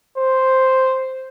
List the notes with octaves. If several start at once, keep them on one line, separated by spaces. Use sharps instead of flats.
C5